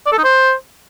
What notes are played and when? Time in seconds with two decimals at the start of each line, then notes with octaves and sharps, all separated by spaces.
0.06 D5
0.12 A4
0.18 D#4
0.24 C5